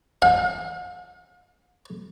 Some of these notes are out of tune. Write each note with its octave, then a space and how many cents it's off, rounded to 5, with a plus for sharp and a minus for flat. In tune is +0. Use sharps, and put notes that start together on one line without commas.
F5 +45